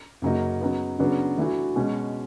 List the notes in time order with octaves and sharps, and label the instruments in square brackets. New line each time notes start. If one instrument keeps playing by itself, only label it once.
[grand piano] F#2 C#3 F#3 A#3 D#4
C#3 F#3 B3 D#4
C#3 F#3 B3 D4
E3 A3 D4 F#4
B2 G#3 C#4